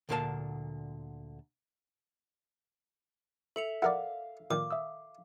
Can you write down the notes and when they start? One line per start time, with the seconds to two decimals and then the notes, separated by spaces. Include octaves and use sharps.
0.09 D2 A#2 D3 A#4 F5 A5
3.56 A4 E5 C#7 F7
3.82 E4 A#4 D5 F5 F#5
4.51 A#2 D#3 D6
4.71 E5 D#6 E6